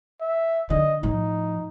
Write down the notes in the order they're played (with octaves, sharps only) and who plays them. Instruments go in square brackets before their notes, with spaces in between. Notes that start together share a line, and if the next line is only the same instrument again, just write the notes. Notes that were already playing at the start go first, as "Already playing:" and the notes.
[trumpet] E5
[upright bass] D3 [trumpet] D#5
[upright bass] A2 F3 [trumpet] D#4